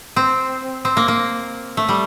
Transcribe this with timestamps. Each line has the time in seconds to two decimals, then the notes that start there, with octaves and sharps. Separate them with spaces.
0.16 C4
0.85 C4
0.97 A#3
1.08 A#3
1.77 A3
1.89 G3